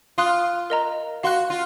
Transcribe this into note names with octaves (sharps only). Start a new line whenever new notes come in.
F4 F5 C6 D#6 F#6
A#4 D#5 A#5
F#4 F5 C6 F#6
F4